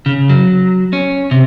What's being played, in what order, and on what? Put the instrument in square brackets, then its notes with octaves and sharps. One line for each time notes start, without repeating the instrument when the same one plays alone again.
[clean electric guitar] C#3
F#3
C#4
C3